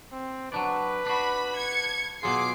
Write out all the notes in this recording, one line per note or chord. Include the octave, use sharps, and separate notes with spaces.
C4
F#3 D4 B4 D5
D4 F#4 B5
G#6 C#7
B2 F#3 F4 G#4 D6 C7